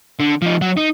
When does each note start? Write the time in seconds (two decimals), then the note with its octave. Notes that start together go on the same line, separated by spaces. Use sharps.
0.19 D3
0.42 F3 D#4
0.61 F#3
0.77 D#4